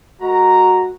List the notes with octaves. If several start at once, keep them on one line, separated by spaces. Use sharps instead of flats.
G#3 F#4 A#4 A#5